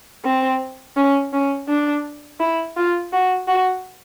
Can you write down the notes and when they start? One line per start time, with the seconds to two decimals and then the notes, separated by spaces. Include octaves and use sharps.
0.24 C4
0.96 C#4
1.33 C#4
1.68 D4
2.40 E4
2.76 F4
3.13 F#4
3.48 F#4